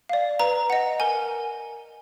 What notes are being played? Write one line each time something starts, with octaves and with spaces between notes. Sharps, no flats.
D5 F5
B4 A#5
D#5 F#5
A#4 G#5